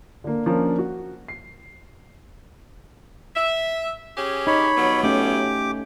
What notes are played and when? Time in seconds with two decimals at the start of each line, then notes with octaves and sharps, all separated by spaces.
0.24 D3 A#3
0.46 F3 A#3 C#4 D4 A#4
0.79 F#4
1.28 C7
3.35 E5
4.17 C#4 G4 G#4
4.47 D#4 C#5 B5
4.77 F#3 G3 B3
5.03 A3 C#4 G4 D6